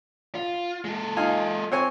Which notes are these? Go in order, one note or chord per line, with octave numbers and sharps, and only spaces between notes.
F4
G#3 A4
D#4 F4 G#5
C4 C#5 G#5